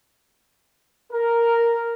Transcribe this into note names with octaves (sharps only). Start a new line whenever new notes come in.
A#4